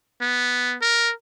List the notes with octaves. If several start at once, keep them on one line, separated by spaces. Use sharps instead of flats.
B3
A#4